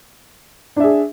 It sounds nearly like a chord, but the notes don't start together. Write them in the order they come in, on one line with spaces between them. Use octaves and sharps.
D4 E5 G#4